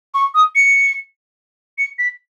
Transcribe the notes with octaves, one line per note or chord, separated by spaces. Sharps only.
C#6
D#6
C#7
C#7
B6